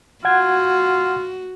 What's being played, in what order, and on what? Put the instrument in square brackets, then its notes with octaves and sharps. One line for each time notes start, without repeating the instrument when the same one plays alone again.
[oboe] F4 [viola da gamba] F#4 [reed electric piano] F#5 G#6